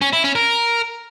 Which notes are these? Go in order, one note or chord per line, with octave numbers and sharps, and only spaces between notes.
C#4
E4
C#4
A#4